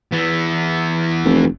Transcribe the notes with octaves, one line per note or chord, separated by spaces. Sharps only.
E3 B3
F1